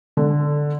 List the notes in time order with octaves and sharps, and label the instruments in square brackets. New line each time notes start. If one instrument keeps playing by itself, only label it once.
[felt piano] D3